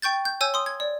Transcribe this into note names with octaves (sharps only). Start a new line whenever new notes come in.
G5 C#6 G6 A6
G6
C#5 G#5 E6 G6
C6 D#6
G#6
D5